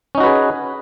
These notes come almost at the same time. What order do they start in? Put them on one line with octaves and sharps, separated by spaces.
C#4 D#4 F#4 B4 G#4